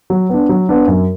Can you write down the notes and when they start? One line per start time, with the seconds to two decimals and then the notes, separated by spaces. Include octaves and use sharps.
0.10 F#3
0.29 B3 D4
0.49 F#3
0.69 B3 D4
0.88 F#2